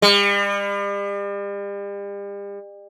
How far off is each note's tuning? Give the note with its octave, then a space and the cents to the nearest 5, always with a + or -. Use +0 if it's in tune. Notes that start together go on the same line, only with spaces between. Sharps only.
G3 +40